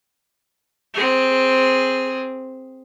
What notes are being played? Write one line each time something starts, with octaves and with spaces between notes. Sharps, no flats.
C4 G#4